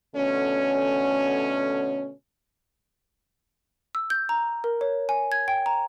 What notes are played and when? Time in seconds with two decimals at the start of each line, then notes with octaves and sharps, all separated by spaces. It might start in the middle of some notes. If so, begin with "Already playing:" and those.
0.16 B2 D3 A3 C#4
3.95 E6
4.10 G6
4.29 A#5
4.64 A#4
4.81 C#5
5.09 G#5
5.32 G#6
5.48 G5
5.66 A#5